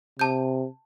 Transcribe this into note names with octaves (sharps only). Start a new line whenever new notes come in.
C3 A5 G6